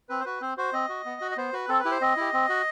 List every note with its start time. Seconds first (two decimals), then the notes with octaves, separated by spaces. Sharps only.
0.09 C4 B4
0.20 C5
0.25 F#4 B4
0.41 C4 C5
0.57 F#4 C5
0.73 C4 D#5
0.89 F#4
1.05 B3
1.21 F#4
1.31 D#5
1.37 B3 C5
1.53 F#4 B4
1.69 C4 A4
1.80 B4
1.85 E4 G4
1.91 C5
2.01 C4 D#5
2.17 E4 G4
2.33 C4
2.49 F#4